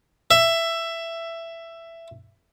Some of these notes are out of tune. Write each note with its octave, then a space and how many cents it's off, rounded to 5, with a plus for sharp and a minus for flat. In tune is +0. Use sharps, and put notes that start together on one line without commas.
E5 +15